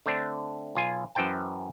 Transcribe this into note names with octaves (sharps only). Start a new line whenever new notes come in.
D3 A3 C4 D4
B1 F4 G#5
F#2 E3 C5 G5 A5